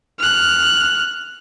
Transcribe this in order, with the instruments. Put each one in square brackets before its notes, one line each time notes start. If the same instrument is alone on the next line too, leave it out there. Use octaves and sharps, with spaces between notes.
[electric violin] F6 F#6